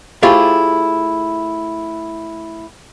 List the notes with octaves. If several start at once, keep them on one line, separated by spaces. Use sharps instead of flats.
A3 E4 F4 G4 G#4 C5